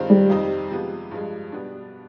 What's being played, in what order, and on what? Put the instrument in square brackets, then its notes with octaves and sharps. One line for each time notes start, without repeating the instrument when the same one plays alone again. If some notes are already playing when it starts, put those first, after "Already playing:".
Already playing: [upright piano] G2 D#3 G#3 C4 F4
[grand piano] G3
[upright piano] F2 C3 G3 C4 D#4
C3 F3 G#3 B3
G2 F3 G#3
B2 G3 B3 D4